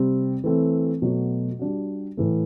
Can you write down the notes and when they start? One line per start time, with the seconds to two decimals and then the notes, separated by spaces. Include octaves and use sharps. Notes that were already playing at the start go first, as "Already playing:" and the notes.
Already playing: C3 G3 C4
0.44 E3 A3 C4
1.02 B2 F#3 A3
1.59 G3 D4 F#4
2.17 A2 E3 A3